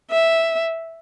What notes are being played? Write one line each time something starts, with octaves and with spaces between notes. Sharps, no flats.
E5